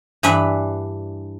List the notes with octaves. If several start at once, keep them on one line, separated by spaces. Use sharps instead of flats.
G2 E3 D4 B4 E5